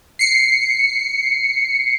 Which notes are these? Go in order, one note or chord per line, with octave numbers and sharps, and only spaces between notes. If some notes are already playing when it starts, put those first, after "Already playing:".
C7 C#7